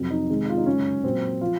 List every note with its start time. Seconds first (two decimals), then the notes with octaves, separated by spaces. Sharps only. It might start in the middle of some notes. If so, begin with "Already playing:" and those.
Already playing: F2 C3 F#3
0.10 D#4
0.29 C3 D#3 G#3
0.49 F4
0.58 D#4
0.66 F#2 C#3 G#3 C#4
1.04 A#2 F#3 C4
1.41 F3 F4